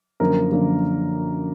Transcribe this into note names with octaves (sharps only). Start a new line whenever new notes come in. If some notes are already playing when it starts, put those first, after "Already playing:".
F#2 D3 F3 A#3 A#4
F#2 D3 F3 A#3